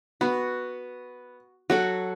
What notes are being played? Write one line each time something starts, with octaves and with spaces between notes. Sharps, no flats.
B3 F#4
F#3 F#4 A4 F#5